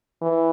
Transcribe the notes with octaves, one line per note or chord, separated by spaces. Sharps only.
E3